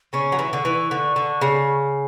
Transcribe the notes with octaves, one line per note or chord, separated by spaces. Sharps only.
C#3 C#4 C#6
F#3
E3
D3
E3
D3
D3
C#3